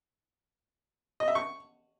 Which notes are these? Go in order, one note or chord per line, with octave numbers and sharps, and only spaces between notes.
D#5
E5
C#6